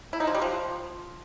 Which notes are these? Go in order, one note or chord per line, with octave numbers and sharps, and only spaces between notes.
E4
D#4
F3
G3
F3